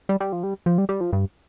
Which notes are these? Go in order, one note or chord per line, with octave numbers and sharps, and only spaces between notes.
G3
G3
F3
G3
F3
G3
G3
F3
G2